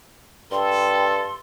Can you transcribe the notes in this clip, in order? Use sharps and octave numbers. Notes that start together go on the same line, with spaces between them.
G2 A4 G5 C6